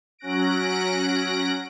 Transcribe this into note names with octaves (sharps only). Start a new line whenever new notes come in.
F#3 C#4 F#6 A#6 D7